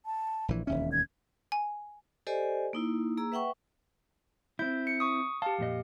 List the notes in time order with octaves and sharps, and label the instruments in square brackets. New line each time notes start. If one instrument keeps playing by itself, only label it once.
[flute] A5
[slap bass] A#1 E3
[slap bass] E1 D#2 C#4 [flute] E5
[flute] G#6
[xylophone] G#5
[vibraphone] G4 A4 C5 D5 D#5 G#5
A#3 D#4 E4
A#3 G#4 A#5 E6
B4 E5 F#5 G5 C#6
[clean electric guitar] C4 E4 [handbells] G6
[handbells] C#7
C#6 D#6
[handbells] G4 F5 [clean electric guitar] A5
[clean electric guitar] F2 A#2 D#5